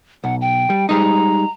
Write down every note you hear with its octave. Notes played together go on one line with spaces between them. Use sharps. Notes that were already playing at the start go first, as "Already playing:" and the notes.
B1 F#5
G5
G3
G3 G#3 D#4 A#5